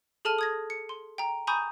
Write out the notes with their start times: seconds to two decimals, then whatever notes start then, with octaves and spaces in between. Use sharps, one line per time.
0.25 G#4 A4 A5 F6 D#7 F7
0.39 D#6 G#6 A#6
0.70 C#7
0.89 C6
1.18 G5 A#5
1.47 G#5 A#5 B5 C#6 D#6 G6